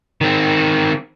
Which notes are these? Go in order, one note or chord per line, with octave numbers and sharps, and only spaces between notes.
D#3 C4